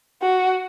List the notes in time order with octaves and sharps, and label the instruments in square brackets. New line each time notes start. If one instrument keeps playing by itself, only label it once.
[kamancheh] F#4